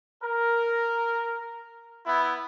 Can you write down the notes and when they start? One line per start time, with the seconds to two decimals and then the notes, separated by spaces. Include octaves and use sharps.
0.23 A#4
2.06 B3 E4